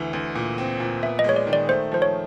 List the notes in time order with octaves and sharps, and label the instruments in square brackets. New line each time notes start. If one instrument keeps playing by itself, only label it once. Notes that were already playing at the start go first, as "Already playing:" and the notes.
Already playing: [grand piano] D2 E3
D2
A#2
C4
A#2
[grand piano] B3 [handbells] E5
[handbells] D#5
[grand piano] G#3 [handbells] C#5
[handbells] D5
[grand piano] D#3
[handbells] D5
[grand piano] A3 [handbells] C5
[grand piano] F3 [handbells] C5
[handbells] C#5